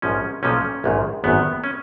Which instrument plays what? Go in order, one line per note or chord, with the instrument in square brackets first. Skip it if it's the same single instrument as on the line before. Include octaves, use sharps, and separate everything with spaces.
[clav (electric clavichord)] A#1 G#2 F3 C#4
B1 A#2 F3 C#4
A#1 G#2 D#3
G#1 F#2 D#3 B3
C#4